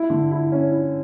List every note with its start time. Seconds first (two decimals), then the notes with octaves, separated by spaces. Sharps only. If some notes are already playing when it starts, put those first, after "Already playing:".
Already playing: E4
0.10 D3
0.31 E4
0.52 C#4
0.72 E4